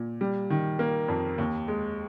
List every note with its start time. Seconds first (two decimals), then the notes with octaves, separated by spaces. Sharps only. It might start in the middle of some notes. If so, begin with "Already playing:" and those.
Already playing: A#2
0.21 G3
0.50 D#3
0.79 A#3
1.08 F2
1.38 D#2
1.68 G#3